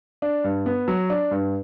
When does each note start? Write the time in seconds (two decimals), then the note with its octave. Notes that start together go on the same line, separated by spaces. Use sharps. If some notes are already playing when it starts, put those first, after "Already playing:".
0.22 D4
0.44 G2
0.66 B3
0.88 F#3
1.10 D4
1.31 G2